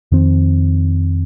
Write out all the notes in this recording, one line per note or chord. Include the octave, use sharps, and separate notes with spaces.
F2 D#3 C4